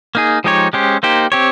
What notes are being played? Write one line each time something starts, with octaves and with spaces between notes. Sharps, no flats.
A#3 D#4 G#4
F3 G#3 D#4 G4 C#5
G#3 C#4 G4 C5
A#3 D#4 G4 C5
C4 G4 C#5